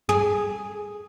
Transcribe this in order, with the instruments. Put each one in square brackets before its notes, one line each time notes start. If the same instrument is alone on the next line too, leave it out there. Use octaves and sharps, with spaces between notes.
[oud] G#4